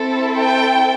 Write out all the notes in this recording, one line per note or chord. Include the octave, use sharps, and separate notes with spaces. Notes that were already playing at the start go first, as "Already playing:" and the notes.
Already playing: C4 E4 A4
G5